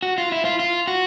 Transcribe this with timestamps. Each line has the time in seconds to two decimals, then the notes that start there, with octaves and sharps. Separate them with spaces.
0.03 F#4
0.18 F4
0.32 E4
0.45 F4
0.60 F4
0.88 F#4